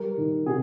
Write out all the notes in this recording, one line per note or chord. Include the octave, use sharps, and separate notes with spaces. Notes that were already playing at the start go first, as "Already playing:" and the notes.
Already playing: G3 A#4
D#3
C3 G#4